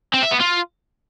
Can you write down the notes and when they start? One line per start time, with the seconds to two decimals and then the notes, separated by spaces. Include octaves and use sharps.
0.14 C4
0.22 E5
0.31 B3
0.40 F4